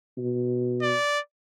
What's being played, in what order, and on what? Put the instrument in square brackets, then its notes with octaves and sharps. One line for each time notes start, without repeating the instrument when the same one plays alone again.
[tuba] B2
[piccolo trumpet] D5